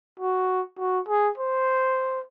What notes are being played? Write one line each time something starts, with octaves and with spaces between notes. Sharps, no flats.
F#4
F#4
G#4
C5